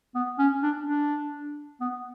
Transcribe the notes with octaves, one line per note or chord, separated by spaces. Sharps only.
B3
C#4
D4
D4
B3